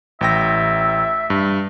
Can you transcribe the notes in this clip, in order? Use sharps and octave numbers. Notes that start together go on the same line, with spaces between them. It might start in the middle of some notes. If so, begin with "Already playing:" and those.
A1 E5 G5 A#6
G2